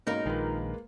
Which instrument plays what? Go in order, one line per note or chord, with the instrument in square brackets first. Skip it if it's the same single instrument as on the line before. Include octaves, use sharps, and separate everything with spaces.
[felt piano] G#2 B2 C#4 [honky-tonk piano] A#3 [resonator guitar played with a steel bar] D#4 A#4
[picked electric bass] A#1 D#3 [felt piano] G#3 F4 B4